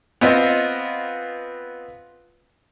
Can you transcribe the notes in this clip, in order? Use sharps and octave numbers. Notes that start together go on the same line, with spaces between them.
B3 C4 F4 D#5